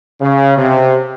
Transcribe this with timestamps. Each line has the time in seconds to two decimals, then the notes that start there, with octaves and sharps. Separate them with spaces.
0.22 C#3
0.58 C3